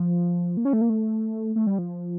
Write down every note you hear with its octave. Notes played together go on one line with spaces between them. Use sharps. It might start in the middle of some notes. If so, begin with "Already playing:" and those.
Already playing: F3
A#3
C#4
A3
A#3
A3
A3
G3
F3